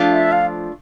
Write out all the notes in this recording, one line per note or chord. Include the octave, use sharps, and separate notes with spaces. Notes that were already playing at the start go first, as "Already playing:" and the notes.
Already playing: F3 A3 D4 F4
E5
F5